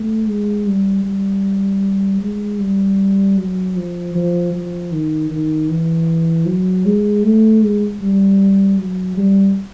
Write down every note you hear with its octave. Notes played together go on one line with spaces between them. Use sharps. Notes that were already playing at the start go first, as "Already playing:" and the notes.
Already playing: A3
G#3
G3
G3
G#3
G3
F#3
F3
F3
F3
D#3
D#3
E3
F#3
G#3
A3
G#3
G3
F#3
G3